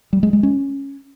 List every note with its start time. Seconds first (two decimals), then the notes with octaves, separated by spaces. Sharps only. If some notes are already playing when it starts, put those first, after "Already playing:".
0.13 G3
0.23 G#3
0.33 G#3
0.43 C#4